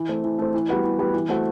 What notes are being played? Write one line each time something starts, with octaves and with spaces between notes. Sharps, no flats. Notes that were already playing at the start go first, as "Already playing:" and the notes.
Already playing: E3
A3 C4
E3
A3 C4
E3
G3 B3 F#4 B4
E3
G3 B3 F#4 B4
E3
A3 C4 F#4